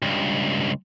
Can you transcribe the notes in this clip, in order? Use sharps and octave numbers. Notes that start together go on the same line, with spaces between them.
C#2 G2